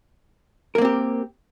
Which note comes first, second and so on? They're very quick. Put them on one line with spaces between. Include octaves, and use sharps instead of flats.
A#4 A#3 C4 G4